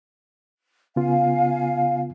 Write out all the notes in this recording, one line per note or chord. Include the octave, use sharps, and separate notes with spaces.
C#3 B3 F4 F5 G#5